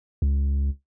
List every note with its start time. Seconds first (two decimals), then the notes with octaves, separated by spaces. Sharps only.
0.22 C#2